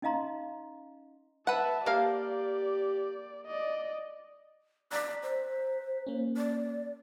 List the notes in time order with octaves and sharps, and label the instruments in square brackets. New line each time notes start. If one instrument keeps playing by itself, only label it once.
[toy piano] C#4 D#4 D#5 F5 A#5 C6
[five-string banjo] B4 F#5 [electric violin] E5 A5
[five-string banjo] A#3 F5 [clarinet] G4 [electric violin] D5
[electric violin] D5 D#5
[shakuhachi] D5 [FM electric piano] A#5 F#6 B6
[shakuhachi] C5
[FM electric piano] A#3 C#4
[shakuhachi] D5